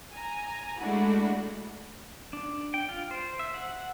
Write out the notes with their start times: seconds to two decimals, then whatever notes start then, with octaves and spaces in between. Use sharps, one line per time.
0.13 G#5 A#5
0.79 G#3 A3 D4 E4 F#4
2.33 D4
2.74 G5
2.89 F4
3.11 C5
3.39 E5
3.54 F#5